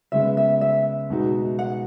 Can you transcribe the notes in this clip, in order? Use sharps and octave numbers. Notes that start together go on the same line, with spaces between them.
C#3 G#3 B3 E5
E5
E5
B2 G#3 D#4 F#4
F#5